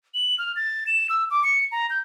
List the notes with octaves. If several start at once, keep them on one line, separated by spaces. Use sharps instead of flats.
F#7
F6
A6
E7
E6
D6
C#7
A#5
G6